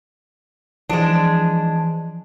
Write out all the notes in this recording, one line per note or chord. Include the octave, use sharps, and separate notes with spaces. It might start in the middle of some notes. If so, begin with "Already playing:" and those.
E3 F3 G#3 D4